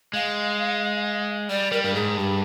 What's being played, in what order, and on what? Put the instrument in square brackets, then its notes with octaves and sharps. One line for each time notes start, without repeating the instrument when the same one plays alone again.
[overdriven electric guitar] G#3 [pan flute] F5
[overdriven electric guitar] G3 [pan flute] D5
[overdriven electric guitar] G3 [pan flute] A#4
[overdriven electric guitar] G2 [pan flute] A#4
[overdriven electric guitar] G#2 [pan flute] G#4
[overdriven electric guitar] G2 [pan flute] G4